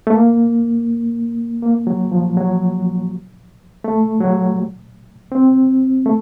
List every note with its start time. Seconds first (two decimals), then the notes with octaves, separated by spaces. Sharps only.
0.07 A3
0.14 A#3
1.62 A#3
1.87 F#3
2.11 F3
2.37 F#3
3.84 A3
4.21 F#3
5.32 C4
6.06 A3